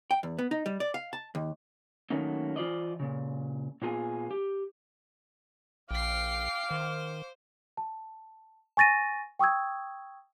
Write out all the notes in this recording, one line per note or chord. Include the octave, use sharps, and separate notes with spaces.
G5
E2
B3
D#4
G3
D5
F5
A5
D#2
D#3 F#3 A3 A#3 C#4 D#4
E3 F4 C5 D5 D#5
A#2 C#3
A#2 B3 F4 G#4 G#5
G4
A#1 F5 G5 D6 F6 C7
D#3 C5
A5
G#5 C#6 A6 A#6 D#7
G5 C#6 D#6 E6 G#6